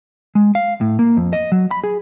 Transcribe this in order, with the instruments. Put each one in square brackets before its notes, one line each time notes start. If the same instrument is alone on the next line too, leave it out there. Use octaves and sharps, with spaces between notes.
[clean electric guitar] G#3
F5
A2
A#3
F2
D#5
F#3
B5
G#4